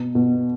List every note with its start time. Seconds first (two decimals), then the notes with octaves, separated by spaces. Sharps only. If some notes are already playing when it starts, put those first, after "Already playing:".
Already playing: B2
0.15 B2